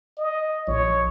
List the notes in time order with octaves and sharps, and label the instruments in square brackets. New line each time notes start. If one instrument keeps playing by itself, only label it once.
[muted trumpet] D#5
[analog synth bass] A#1 [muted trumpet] C#5